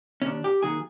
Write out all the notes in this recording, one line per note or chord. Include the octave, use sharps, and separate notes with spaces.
C#4
D#2 D4
G4
D#3 F#3 A#3 G#4